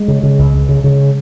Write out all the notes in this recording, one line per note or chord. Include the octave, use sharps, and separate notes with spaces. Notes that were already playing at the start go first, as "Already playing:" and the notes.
Already playing: G#3
C#3
C#3
C#2
C#2
C#3
C#3